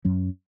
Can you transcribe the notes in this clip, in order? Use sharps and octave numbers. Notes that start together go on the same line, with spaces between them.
F#2 F#3 C#4